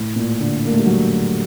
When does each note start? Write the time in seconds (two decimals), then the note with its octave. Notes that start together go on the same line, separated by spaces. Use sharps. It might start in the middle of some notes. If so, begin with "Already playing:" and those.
Already playing: A2
0.16 A#2
0.40 D3
0.65 A#3
0.71 A3
0.79 G3
0.86 F#3